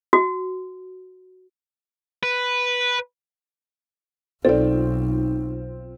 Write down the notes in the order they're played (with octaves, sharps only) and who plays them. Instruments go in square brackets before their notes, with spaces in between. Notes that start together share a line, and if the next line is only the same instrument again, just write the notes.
[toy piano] F#4
[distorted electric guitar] B4
[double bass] B1 [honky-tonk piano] C4 F4 [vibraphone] D#4 [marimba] A4 D5